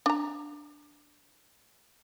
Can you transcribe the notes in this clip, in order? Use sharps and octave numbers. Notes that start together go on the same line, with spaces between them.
D4 A#5